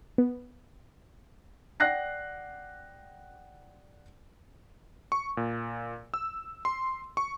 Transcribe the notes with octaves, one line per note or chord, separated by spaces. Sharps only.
B3
D5 F#5 G5 F#6 A#6 C7
C#6
A#2
E6
C6
C#6